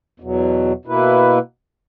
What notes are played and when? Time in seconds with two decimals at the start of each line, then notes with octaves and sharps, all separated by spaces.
0.20 E2 B2 F#3
0.85 B2 A#3 E4 B4